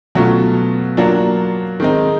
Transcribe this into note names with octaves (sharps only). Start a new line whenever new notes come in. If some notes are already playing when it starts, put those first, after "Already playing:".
B2 F#3 A3 C#4 F4
F#3 A#3 D4 F4
D#3 G#3 C4 D#4